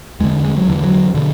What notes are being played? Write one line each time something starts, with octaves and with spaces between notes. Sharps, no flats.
E2 D3 G#3
G#3
F#3
E2 D3 E3
F#3
B2 D3